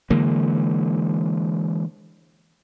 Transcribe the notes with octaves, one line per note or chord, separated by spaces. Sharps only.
D3 E3 G#3 A#3